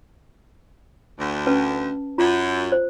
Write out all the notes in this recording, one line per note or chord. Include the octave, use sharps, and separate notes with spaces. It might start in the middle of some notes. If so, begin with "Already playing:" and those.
D2
C#4 B4 A5
F#2 F4 A#5
C5